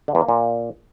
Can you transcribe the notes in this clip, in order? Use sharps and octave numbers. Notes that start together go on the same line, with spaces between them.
D3
E2
A#3
A#2